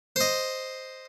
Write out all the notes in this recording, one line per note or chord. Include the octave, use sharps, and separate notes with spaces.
C5 D#5